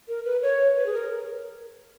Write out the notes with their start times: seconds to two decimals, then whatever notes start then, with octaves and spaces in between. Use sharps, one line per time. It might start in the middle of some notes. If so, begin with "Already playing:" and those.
0.08 A#4
0.25 B4
0.42 C#5
0.77 B4
0.86 G#4
0.94 A#4